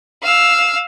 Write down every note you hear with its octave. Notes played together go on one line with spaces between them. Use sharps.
F5 E6